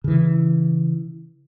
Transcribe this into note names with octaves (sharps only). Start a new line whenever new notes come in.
C#3 E3